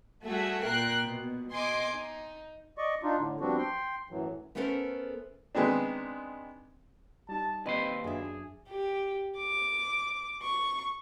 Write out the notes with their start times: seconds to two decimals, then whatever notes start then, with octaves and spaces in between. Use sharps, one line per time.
0.24 G3 A3 F#4 G#4 E5
0.65 A#2 A#4 G5 F#6 C7
1.07 B2
1.54 D#5 G#5 C6 D6
1.92 D#4
2.78 D5 D#5 C#6
3.03 D4 D#4 F4
3.18 A2 D3
3.41 F3 G3 B3 C4 D4 F#4
3.58 G5 C6
4.10 F#2 A2 E3 F#3
4.55 A3 B3 C#4 A4 A#4 C5
5.55 D#3 G#3 B3 C4 D4
7.29 G3 D#4 A5
7.66 D#2 C4 B4 D#5 C6
8.04 F#2 D4 G#4 E5
8.69 G4
9.38 D6
10.42 C#6